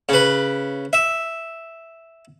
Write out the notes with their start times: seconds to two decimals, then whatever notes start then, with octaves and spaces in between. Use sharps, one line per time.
0.09 C#3 B4
0.93 E5